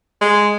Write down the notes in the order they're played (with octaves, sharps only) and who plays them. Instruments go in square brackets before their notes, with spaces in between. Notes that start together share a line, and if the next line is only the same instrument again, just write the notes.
[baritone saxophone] G#3